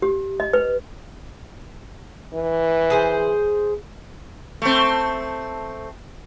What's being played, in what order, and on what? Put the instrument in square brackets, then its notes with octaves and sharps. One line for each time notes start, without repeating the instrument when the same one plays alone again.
[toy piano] G4
D#5
B4
[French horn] E3
[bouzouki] G#4 A4 C5
[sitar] A3 C4